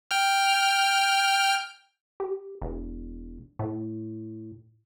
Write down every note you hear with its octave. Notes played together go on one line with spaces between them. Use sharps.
G5 F6
G4
E1
A2